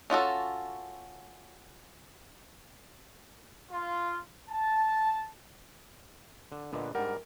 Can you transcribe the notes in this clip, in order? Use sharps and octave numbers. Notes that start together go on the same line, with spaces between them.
C#4 F4 F#4 A4
F4
A5
D3
A#2 D3 B3 D4 B4 D#5
G#2 G3 D4 F4 A#4 F#5